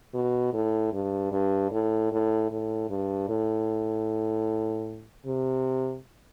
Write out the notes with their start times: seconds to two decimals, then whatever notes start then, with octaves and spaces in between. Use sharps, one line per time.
0.14 B2
0.53 A2
0.93 G2
1.32 G2
1.71 A2
2.12 A2
2.51 A2
2.90 G2
3.29 A2
5.26 C3